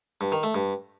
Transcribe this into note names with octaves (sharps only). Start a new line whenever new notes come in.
G2
D#3
A3
G2